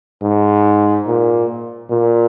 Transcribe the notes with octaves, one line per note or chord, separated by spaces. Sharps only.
G#2
A#2
A#2